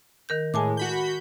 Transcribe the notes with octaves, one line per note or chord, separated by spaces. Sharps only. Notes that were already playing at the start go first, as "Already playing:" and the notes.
D#3 A#4 G6
A2 G#3 G#5 A5 D6
F#4 B5 G6